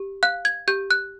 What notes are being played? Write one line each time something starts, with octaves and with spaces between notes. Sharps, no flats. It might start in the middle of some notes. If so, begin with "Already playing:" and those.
Already playing: G4
F5 F#6
G#6
G4 G6
F#6